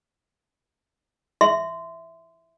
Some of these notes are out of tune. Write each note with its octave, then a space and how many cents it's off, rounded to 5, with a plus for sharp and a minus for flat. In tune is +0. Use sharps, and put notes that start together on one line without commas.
E5 +0 C6 -20